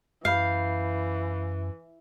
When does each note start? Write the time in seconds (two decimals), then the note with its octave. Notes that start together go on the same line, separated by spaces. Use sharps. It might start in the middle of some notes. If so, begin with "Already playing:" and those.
0.25 F#2 E3 F5 B5 G6 C7